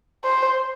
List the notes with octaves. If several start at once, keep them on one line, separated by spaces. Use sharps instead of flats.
C5